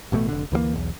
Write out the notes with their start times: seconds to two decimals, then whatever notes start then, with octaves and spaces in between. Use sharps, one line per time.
0.12 A1 B2 F#3 A3
0.29 F1 D3
0.52 D2 E3 F3 A#3
0.73 B1 E2